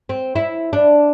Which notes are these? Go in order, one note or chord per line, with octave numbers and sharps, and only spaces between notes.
C4
E4
D4